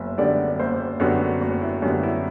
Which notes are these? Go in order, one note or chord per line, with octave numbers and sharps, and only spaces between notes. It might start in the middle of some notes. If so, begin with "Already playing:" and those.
Already playing: F#1 F#2 B3 E5
F#2 D3 G3 B3 D5
F#1 C5
F#2 D3 G3 B3 F#4
F#1 F#4
E4
F#2 D3 G3 B3 F#4
E4